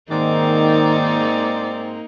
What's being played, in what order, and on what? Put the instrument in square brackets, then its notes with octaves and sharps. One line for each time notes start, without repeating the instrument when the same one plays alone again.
[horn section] G#2 C4 [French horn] D#3 [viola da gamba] A#3 D#4 [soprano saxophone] D5